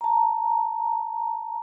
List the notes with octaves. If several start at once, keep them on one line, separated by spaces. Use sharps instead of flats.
A5 A#5